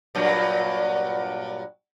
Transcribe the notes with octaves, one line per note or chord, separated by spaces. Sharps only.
G2 A#2 F#3